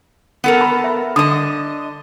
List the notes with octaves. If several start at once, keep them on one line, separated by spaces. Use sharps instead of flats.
B3 A4 A#4
B5
E5
D3 D#5 D#6